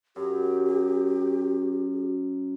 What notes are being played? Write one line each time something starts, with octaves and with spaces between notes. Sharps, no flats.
F#2 G4